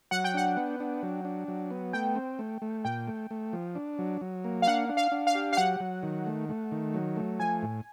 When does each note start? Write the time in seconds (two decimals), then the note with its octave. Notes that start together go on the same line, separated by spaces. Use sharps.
0.11 F#3 F#5
0.24 G5
0.34 D4 F#5
0.57 B3
0.80 D4
1.03 F#3
1.25 D4
1.48 F#3
1.71 B3
1.93 A3 G5
2.16 C4
2.39 A3
2.62 A3
2.85 A#2 G5
3.07 A3
3.31 A3
3.53 F3
3.75 D4
3.99 F#3
4.21 F#3
4.44 A#3
4.62 F5
4.67 D4 F#5
4.89 D4
4.97 F5
5.12 D4
5.27 F5
5.35 G4
5.53 F5
5.57 F#3 F#5
5.80 F#3
6.03 D#3
6.26 A3
6.49 A3
6.72 D#3
6.94 F#3
7.16 A3
7.40 F3 G#5
7.62 A2